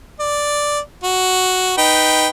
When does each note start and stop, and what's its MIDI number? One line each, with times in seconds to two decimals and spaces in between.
0.20 0.80 74
1.04 1.74 66
1.78 2.28 63
1.78 2.28 71
1.78 2.28 79